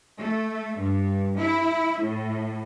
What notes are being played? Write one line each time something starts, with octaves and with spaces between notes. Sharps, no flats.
A3
G2
E4
A2